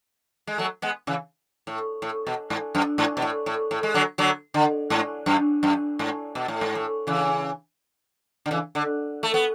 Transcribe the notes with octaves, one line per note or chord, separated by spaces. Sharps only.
G#3
F#3 A3
G#3 B3
C#3 E3
A2
A2
B2
G#2
F#2
G#2
B2
A2
A2
A2
G#3
D3 F#3
D3 F#3
D3
G#2
F#2
F#2
G#2
B2
A2
G#2
A2
C#3 E3
D3
C#3 E3
D3
A3
B3